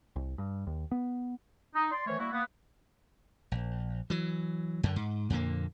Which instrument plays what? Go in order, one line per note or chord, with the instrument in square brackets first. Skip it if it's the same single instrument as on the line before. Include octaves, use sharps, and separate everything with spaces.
[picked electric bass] C2
G2
D#2
B3
[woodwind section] D#4
D5 C6
D#3 E3 A3 C5 C#5
G3 A#3 E4 F#4
A#3 B3
[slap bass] A#1
E3 F#3
F#2 D3
G#2
F2 A#2 D3 A#3